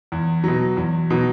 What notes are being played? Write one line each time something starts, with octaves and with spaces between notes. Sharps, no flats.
E2
B2 F#3
E2
B2 F#3